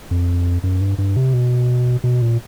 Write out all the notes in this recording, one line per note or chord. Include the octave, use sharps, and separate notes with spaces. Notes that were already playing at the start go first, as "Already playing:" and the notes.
F2
F#2
G2
G2
C3
B2
B2
A#2